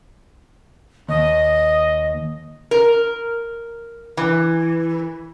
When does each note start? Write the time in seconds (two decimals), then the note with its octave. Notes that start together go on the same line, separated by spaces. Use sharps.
1.09 D#2 D#5
2.71 A#4
4.17 E3